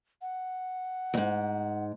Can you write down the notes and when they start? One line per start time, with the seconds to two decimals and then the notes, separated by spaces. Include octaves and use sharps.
0.22 F#5
1.14 F2 G#2